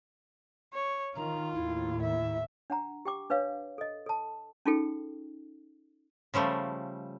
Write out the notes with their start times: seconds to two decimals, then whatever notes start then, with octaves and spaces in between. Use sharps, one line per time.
0.74 C#5
1.16 D#3 F4 A#5
1.53 D#2 A2 E4
2.02 E5
2.70 D4 F#5 A#5
3.05 G4 G5 D6
3.30 D4 B4 C#5 F5
3.78 A4 D#5
4.06 A4 A5
4.66 C#4 D#4 F4 G#4 A4 G5
6.34 C#3 F3 G3 A3